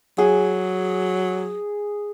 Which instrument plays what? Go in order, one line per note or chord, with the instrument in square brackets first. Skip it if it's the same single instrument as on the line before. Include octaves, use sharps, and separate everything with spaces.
[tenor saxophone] F#3 [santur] G#4